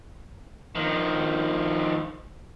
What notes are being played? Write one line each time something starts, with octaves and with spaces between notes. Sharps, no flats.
D#3 F3